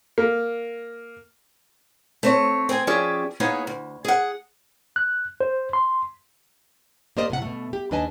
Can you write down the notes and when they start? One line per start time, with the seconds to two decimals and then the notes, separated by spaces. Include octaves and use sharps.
0.18 A#3
2.23 A3 C4 C#5
2.69 C4 G#4 C5 G#5
2.87 F3 C#4 G4 G#4 D5 E5
3.40 A#3 B3 D#4 G#4 C#5
3.67 D2
4.05 G#4 F#5
4.96 F#6
5.41 C5
5.73 C6
7.17 A#3 G4 A#4 C5 D5 D#5
7.30 A2 C3 F#5
7.42 B2 A3
7.73 G4
7.91 D#2 D4 B4 D#5 G#5 A5